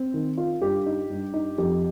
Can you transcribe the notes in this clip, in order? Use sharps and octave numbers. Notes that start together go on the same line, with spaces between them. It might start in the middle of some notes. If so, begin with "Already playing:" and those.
Already playing: C4
D#3
F4
G2 G4
D#4
G2
D#4
F2 G4